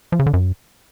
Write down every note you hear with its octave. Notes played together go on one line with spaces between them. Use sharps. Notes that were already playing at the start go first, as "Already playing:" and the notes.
F3
C#3
D3
F#2